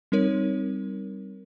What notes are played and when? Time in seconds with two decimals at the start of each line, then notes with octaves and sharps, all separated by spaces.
0.12 G3 C4 D#4 A#4 C#5